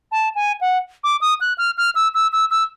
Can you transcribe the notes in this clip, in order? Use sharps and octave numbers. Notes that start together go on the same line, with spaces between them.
A5
G#5
F#5
D6
D#6
F#6
F6
F6
E6
E6
E6
E6